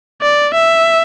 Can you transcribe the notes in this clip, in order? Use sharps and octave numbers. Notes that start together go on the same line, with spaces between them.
D5
E5